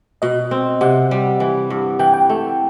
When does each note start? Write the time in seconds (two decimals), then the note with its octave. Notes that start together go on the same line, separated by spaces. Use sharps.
0.22 B2 D#5
0.51 C4
0.81 C3 F#5
1.11 G3
1.40 E3
1.70 G2
1.99 E3 G5
2.14 G5
2.30 A3